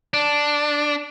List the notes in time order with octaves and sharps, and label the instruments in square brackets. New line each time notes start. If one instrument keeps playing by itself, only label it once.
[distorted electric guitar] D4